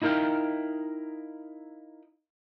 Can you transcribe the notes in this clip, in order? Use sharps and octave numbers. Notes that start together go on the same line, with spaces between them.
D#4 E4 A#4 D#5 F5 G5